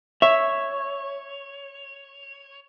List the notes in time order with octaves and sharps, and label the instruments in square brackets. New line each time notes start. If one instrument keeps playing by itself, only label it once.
[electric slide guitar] C#5 [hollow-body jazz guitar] E5